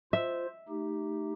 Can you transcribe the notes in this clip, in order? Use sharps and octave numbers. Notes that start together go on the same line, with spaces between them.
F4 C5 E5
A3 D#4 G4